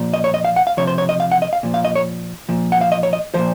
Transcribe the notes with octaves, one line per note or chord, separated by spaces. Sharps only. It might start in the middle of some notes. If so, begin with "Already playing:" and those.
Already playing: A#2 F3
D#5
C#5
D#5
F5
F#5
F5
C3 F3 C#5
C5
C#5
D#5
F5
F#5
D#5
F5
A#2 F3
F5
D#5
C#5
A#2 F3
F#5
F5
D#5
C#5
D#5
A#2 F3 C5